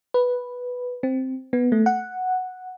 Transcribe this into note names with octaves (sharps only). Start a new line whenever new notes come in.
B4
C4
B3
A3
F#5